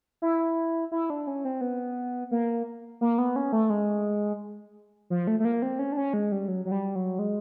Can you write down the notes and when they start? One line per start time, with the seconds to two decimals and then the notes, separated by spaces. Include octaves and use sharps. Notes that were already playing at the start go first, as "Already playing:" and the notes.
0.22 E4
0.92 E4
1.10 D4
1.27 C#4
1.45 C4
1.61 B3
2.31 A#3
3.01 A#3
3.18 B3
3.36 C#4
3.52 A3
3.70 G#3
5.10 F3
5.27 A3
5.40 A3
5.45 A#3
5.62 C4
5.79 C#4
5.92 D4
5.97 C#4
6.13 G#3
6.32 G3
6.48 F#3
6.65 F#3
6.72 G3
6.95 F#3
7.19 G#3